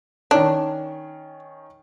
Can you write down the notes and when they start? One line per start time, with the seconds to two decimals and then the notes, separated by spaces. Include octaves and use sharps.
0.31 D#3 C#4 D4